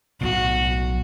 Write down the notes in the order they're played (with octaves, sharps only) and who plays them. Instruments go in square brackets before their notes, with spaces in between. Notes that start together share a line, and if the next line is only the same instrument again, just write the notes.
[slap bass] B1 A2 [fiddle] F#4